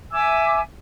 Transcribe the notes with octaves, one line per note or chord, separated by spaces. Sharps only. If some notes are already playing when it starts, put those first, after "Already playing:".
E5 G#5 D6 E6